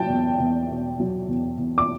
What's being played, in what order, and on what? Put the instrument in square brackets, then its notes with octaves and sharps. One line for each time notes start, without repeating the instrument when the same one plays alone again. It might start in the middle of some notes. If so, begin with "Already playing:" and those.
Already playing: [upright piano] F#3 G5 A5
E2
E2
B2
F#3
E2
E2
D6